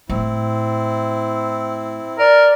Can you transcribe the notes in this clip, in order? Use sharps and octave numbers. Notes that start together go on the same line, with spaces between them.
A2 C4 E4
A#4 D5